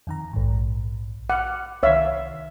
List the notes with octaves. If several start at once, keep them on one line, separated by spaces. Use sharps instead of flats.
F2 D#3 A#5
A#1 G#2
F#5 D6 F6
C2 D#3 C#5 E5 F5